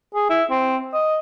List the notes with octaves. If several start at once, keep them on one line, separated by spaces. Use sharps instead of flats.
G#4
E4
C4
D#5